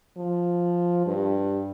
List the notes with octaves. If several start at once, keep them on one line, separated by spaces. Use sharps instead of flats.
F3
G2